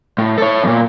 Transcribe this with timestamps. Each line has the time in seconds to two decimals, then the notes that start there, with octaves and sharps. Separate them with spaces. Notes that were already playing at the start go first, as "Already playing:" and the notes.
0.18 A2
0.38 A4 C#5
0.64 E2 A#2